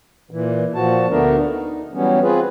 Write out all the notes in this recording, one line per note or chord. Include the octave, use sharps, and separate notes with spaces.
A#2 E3
A#2 F3 F#4 A5
D2 D3 A3 B3 D4 A#4
D#4
E3 F#3 G3 B3 C#4
C4 F4 G#4 B4